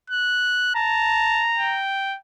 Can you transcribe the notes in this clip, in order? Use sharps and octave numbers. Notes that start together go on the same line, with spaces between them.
F#6
A5 A#5
G5